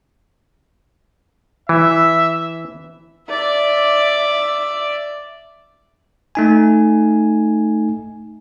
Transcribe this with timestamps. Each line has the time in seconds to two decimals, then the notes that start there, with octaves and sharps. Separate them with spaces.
1.69 E3 E5
3.29 D5 E5
6.35 A3 D#4 G#5